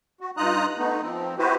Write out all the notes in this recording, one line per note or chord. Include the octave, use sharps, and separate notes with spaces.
F#4
G2 D#4 F4 A#5 D#6 F#6
A3 B3 D#4
F3 C4
E4 F#4 G4 B4 C5